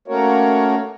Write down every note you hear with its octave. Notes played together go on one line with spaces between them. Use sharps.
A3 A#3 C#4 F#4 A#4 C#5